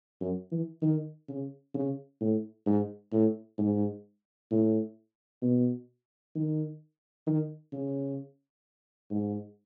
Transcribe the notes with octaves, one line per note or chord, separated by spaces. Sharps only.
F#2
E3
D#3
C#3
C#3
A2
G#2
A2
G#2
A2
B2
D#3
D#3
C#3
G#2